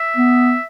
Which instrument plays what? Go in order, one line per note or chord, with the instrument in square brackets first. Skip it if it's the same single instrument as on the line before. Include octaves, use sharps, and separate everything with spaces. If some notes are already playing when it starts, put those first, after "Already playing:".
Already playing: [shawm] E5
[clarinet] B3